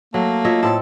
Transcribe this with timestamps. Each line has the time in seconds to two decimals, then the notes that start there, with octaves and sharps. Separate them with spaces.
0.14 F#3 A3 A#3
0.45 F4 C#5 D#5 E5
0.63 A2 C4 A4 A5